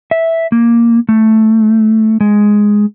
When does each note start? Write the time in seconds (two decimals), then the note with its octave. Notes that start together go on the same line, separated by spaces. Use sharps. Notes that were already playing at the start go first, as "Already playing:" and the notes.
0.11 E5
0.52 A#3
1.09 A3
2.21 G#3